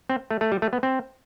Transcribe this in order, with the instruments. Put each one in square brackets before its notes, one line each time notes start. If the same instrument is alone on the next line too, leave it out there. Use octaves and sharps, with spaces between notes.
[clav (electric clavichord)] C4
A3
A3
G3
A3
B3
C4